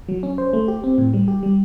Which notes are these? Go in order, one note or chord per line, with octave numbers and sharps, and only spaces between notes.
F#3
C#4
C5
A3
G4
C4
A2
G3
G4
G3